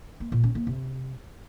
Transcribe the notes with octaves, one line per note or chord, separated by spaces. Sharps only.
A#3
A#2
C#4
A#3
C3